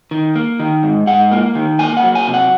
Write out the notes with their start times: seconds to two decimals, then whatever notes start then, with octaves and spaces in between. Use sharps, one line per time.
0.11 D#3
0.35 A#3
0.59 D#3
0.83 G#2
1.07 G#2 F#5
1.32 A#3
1.55 D#3
1.79 A#3 G#5
1.97 F#5
2.03 F#3
2.15 G#5
2.27 C3
2.34 F#5